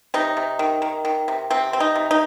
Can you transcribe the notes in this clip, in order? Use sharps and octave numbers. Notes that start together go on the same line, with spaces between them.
C3 D#4
C3
D#3
D#3
D#3
C3
C3 C4
C4
D#4
C3
D#4